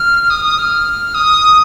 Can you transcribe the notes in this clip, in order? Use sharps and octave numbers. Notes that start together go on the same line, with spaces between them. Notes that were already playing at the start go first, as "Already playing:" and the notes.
Already playing: F6
D#6
D#6
F6
D#6